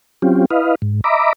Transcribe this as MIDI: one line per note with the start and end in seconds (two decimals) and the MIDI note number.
0.22 0.46 54
0.22 0.46 60
0.22 0.46 61
0.22 0.46 65
0.22 0.46 67
0.50 0.75 64
0.50 0.75 71
0.50 0.75 75
0.50 0.75 77
0.82 1.01 44
1.04 1.33 75
1.04 1.33 76
1.04 1.33 82
1.04 1.33 83
1.04 1.33 86